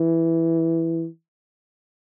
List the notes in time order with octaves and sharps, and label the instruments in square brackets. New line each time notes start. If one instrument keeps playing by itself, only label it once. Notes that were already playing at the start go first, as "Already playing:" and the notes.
Already playing: [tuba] E3